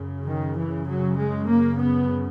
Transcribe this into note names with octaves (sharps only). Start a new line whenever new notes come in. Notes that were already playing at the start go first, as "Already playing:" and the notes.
Already playing: F#2 C#3
D#3
E3
F#3
G#3
A#3
B3